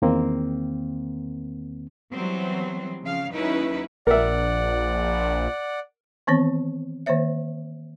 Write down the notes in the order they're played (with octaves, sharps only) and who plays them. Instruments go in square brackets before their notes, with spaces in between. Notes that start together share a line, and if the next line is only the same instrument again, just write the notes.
[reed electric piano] E2 D#3 A#3 C4
[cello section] E3 F#3 G3 B3 C4
C#3 F3 F5
D#2 F#3 C#4 D#4 E4 B4
[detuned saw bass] A#1 [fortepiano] A#4 E5 [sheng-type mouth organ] D5 F#5
[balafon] D#3 E3 B3 C4 C#5
D#3 A#3 C5 C#5 E5